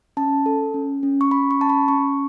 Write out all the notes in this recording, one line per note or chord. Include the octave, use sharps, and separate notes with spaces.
C#4 A5
A4
C#4
C#4
C#6
C#4 B5
C#6
C#4 A5
B5
C#4 C#6